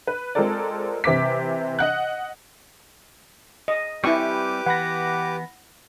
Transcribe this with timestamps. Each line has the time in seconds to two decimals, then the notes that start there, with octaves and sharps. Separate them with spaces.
0.07 B4
0.35 G#3 C4 F4 A4 A#4 D5
1.04 C3 E3 C4 D6 B6
1.79 D#5 F#5 F#6
3.68 D#5
4.04 G3 C4 E4 G4 B4 G#5 C#6 D6
4.66 E3 B3 F#5 B5 A#6